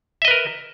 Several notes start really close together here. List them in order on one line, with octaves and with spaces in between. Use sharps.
E5 D#5 B4 A#4